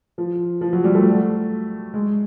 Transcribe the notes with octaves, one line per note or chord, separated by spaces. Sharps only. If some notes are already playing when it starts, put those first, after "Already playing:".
F3
F3
F#3
G3
A3
G#3